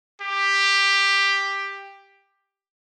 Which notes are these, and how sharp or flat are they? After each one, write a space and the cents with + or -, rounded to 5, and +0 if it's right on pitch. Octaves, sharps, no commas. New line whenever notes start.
G4 +10